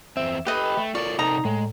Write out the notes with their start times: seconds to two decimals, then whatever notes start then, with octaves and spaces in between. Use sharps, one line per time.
0.17 E2 C4 E5
0.47 G4 A4 B4 D#5 G5
0.77 A3
0.95 F4 A4 A#4 D5 C#6
1.19 C3 D#4 A4 A#4 A#5
1.45 A2 G#3